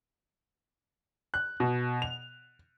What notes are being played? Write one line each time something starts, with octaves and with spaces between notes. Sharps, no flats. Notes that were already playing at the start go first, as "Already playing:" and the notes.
F#6
B2
F7